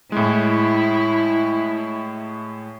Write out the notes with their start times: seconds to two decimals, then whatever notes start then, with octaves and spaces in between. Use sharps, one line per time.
0.12 A2 G#3 E4